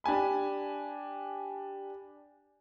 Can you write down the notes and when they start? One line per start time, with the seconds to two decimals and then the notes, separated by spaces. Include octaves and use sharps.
0.04 D4 G4 G#5 B5